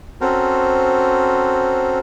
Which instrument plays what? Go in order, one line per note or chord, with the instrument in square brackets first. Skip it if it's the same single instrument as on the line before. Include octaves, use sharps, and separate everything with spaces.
[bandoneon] C4 C#4 F#4 A4 A#4 C5